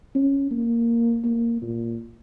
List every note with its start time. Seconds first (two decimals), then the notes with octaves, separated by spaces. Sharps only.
0.15 C#4
0.51 A#3
1.24 A#3
1.62 A#2